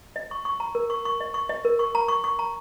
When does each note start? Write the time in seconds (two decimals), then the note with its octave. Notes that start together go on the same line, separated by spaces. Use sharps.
0.16 D#5
0.31 C#6
0.45 C#6
0.60 A#5
0.75 A#4
0.90 C#6
1.05 C#6
1.20 D#5
1.34 C#6
1.49 D#5
1.65 A#4
1.79 C#6
1.95 A#5
2.08 C#6
2.24 C#6
2.39 A#5